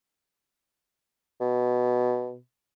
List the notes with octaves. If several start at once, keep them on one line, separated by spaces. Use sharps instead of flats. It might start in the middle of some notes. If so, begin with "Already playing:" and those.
B2